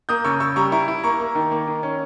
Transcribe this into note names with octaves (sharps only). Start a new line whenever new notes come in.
A#3 D#6 G6
C#3 C#6 E6
C#3 C#6 E6
G3 A#5 C#6
E4 A#5 C#6
E4
A#3 A#5 C#6
A#3
D#3
A#3
D#3
C#4